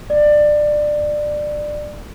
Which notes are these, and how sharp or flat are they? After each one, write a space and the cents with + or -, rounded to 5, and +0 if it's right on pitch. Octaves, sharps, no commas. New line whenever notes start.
D5 +20